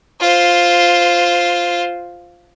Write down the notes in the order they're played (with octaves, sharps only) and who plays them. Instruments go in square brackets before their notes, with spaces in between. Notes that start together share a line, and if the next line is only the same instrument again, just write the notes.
[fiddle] F4 C5